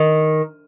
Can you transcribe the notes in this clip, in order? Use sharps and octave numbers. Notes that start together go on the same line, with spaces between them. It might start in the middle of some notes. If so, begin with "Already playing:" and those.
Already playing: D#3